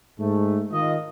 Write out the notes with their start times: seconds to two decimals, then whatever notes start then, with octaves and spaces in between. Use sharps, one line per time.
0.19 G#2 A3
0.72 D#3 F4 D#5